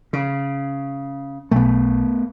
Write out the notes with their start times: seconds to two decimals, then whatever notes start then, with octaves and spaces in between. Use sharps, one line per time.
0.13 C#3
1.51 B1 A3 B3